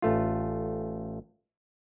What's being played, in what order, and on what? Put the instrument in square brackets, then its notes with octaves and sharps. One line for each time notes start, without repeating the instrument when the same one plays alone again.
[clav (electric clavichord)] A1 A3 F4